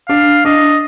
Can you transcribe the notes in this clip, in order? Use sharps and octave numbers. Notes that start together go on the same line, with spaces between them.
D4 F5
D4 D#5